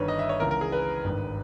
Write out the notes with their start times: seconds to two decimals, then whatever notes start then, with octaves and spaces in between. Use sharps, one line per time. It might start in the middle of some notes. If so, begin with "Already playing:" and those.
Already playing: G1 G2 D#3 B4 C#5
0.08 D#5
0.19 E5
0.29 C#5
0.40 C#2 C#3 E3 A#4
0.51 A#4
0.61 G#4
0.72 B4
1.04 G#1 G2 D#3